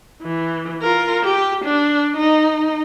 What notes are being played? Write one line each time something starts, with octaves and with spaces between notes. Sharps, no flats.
E3
F4 A#4
G4
D4
D#4